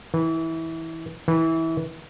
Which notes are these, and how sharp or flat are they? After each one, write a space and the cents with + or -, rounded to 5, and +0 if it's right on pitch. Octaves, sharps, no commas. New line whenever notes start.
E3 -20
E3 -20